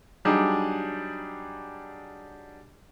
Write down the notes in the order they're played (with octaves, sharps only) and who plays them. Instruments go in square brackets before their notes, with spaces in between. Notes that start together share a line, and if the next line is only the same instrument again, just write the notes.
[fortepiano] F#3 G3 D4 D#4 G#4